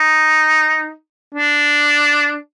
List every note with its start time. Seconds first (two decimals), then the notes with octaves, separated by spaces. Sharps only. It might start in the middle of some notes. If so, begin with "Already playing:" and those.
Already playing: D#4
1.34 D4